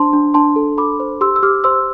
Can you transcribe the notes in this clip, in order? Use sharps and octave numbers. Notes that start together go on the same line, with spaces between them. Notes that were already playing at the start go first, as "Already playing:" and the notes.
Already playing: D4 C5 A5 C6
D4
D4 A5 C6
A4
A4 B5 D6
C5
G4 C6 E6
E6
G4 D6 F6
C5 C6 E6